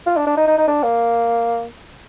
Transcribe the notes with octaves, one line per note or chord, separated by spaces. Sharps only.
F4
D4
D4
D#4
D#4
D#4
D4
A#3